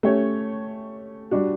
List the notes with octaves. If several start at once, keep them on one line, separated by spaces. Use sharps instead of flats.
A3 C#4 G4 C#5
G3 D4 F#4